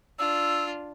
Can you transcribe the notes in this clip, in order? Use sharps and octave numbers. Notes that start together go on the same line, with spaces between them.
D4 F4 E6